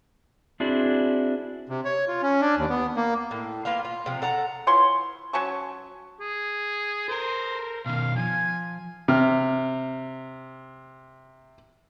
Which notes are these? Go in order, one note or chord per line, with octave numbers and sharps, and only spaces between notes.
C4 D4 E4 F#4 G#4
C3
C#5
F4
C#4
D4
D#2
B3
A#3
A2
A#3 B3 F4 F5
F4
C3 F3
A4 F#5 A#5
E3 F4 C#5 C6
F#3 C#4 A5 C#6
G#4
A4 A#4 C5
B2 D#3 F5
F3 G#5
C3 F6